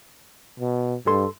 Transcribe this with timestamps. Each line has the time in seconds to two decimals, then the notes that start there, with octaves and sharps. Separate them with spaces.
0.60 B2
1.07 G2 A4 C6